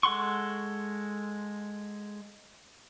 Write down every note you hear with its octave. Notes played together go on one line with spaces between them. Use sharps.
G#3 A4 F#5 C6 C#6